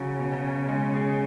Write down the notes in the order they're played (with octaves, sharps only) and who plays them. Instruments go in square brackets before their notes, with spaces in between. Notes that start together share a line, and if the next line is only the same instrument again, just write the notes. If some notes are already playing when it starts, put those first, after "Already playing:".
Already playing: [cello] C#3 [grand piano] F#3 F#4
[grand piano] B2
C#4
G#3
G#4